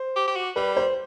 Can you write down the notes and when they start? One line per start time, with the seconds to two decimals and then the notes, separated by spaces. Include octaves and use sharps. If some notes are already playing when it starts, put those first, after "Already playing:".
Already playing: C5
0.16 G4
0.27 G4
0.36 F#4
0.56 G3 B4
0.77 C5